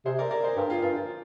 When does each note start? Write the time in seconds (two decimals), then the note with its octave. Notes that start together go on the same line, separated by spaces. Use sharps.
0.06 C3 G#4 C5
0.18 A#4 D5
0.31 A#4 D5
0.44 G#4 C5
0.56 G2 G4 A#4
0.70 F4 G#4
0.82 G2 F4
0.95 F4